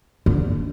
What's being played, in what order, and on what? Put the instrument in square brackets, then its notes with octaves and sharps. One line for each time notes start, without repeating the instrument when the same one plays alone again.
[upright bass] D3